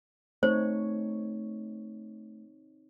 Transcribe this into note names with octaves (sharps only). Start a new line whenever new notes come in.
A3 C4 D#4 C5 C#5